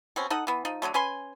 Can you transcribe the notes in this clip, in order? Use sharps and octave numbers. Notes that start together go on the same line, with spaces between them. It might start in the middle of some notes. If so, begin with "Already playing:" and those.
B2 C4 C#4
D#4 A4 D#5 F#5
E3 B3
F3 D#4
D3 F#3 G3 A3
C#4 B4 G#5 C6